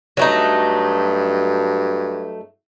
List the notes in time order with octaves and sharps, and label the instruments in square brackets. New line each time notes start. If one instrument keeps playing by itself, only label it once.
[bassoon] G2 [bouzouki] F#3 A3 D#4